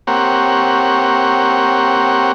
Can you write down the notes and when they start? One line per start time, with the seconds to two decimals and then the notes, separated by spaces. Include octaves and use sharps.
0.07 A#3 C4 G4 C#5 F#5